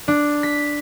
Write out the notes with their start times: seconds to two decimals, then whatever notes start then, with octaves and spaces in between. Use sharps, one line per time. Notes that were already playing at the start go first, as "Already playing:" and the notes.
0.08 D4
0.43 B6